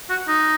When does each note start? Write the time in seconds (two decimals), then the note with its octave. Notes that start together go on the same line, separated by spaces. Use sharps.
0.10 F#4
0.28 D#4